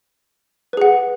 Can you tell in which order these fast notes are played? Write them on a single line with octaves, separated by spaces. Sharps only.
B4 G#4 F#5